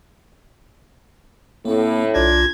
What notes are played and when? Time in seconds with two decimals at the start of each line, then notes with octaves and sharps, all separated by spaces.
1.65 A2 A#3 C4
2.14 B1 D4 F4 G#6 A#6